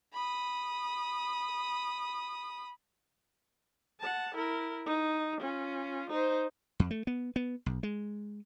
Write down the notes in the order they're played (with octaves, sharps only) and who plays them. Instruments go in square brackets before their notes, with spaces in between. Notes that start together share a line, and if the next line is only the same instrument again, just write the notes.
[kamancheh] B5 D#6
[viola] F#5 A5
E4 A#4
D#4
C#4 F4
D#4 C5
[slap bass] F2
A3
B3
B3
B1
G#3